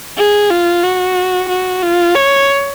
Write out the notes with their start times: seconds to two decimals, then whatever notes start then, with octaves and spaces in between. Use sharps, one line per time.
0.18 G#4
0.51 F4
0.84 F#4
1.49 F#4
1.83 F4
2.15 C#5